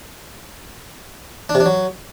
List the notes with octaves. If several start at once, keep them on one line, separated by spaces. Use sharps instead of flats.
D4
C3
D4
F#3